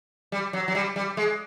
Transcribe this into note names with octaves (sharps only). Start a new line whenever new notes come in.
G3
F#3
F#3
G3
G3
G#3